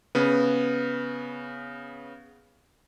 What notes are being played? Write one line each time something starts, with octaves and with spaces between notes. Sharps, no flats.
C#3 B3